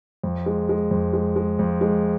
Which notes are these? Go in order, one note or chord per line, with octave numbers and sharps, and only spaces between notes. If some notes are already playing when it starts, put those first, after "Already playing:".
F2
G#3
G#3
F2
G#3
G#3
F2
G#3